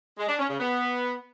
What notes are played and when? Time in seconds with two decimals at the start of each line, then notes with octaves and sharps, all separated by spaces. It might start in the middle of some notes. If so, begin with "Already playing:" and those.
0.18 G#3
0.29 D4
0.39 C#4
0.49 C#3
0.60 B3